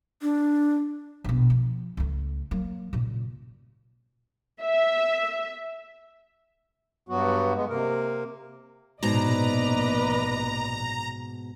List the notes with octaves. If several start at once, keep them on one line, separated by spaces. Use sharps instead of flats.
D4
A#1 B2
F3
C#2 A3
F#3 A#3
A#2 C#3
E5
G2 F#3 B3 F#4
G#3 B3
C3 A#3 A#4
A#1 G#2 B2 B4 D5 D#5 A#5